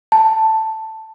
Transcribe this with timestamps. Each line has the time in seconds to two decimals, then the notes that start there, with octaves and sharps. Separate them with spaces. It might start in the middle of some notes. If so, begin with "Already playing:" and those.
0.12 A5